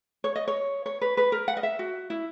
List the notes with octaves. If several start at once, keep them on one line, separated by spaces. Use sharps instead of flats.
C#5
D#5
C#5
C#5
B4
B4
A#4
F#5
D#5
E5
F#4
E4